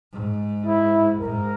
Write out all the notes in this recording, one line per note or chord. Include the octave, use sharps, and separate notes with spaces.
G#2
E4
G#2 A#4